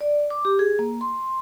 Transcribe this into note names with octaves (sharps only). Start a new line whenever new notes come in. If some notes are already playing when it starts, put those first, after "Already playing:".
D5
D6
G4
G#4
A#3
C6